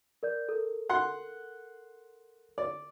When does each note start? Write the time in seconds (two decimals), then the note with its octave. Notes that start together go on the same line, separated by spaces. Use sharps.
0.23 A#4 D5 G6
0.49 A4 A#4
0.89 F#5 C6
2.58 D5